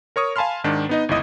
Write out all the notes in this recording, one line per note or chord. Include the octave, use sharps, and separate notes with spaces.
A#4 C#5 C#6 D#6
F5 G#5 A5 B5 C6 F6
G#2 D#3 D4
B3 D#4 D#5
G1 C#2 E4 D#5 D#6